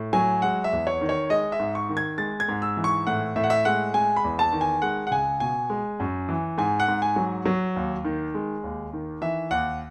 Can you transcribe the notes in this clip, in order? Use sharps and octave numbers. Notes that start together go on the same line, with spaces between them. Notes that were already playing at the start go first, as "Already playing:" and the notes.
Already playing: A2
F#3 G#5
G#3 F#5
E5
E2
C#5
D#3
C#5
G#3 D#5
E5
G#2
C#6
D#3
G#6
G#3 A6
G#6
G#2
E6
E3
C#6
A2 F#5
A2 E5
F#5
E5
G#3 F#5
G#3 G#5
B5
E2
A5
D#3
G#5
G#3 F#5
F#5
C#2 G#5
B2 G#5
G#3
F#2
E3
G#2 G#5
F#5
G#2
G#5
F#3
F#3
D#2
D#3
G#3
D#2
D#3
E3 E5
D#2 F#5